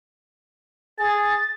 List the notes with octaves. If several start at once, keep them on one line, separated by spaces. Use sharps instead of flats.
G#4 A6